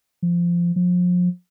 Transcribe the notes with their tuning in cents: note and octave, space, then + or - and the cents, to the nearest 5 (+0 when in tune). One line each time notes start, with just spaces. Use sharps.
F3 -15
F3 +35